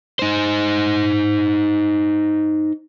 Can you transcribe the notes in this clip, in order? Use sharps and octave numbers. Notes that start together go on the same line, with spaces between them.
D#4 C5